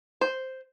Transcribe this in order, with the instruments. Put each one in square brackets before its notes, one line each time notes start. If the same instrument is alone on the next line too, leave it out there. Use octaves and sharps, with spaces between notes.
[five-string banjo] C5